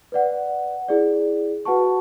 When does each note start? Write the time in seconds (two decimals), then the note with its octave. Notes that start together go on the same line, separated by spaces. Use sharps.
0.12 B4 D5 F#5
0.88 E4 G#4 D5
1.65 F#4 B4 F#5 A5 C#6